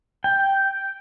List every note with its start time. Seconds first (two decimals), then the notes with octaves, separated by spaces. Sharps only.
0.24 G5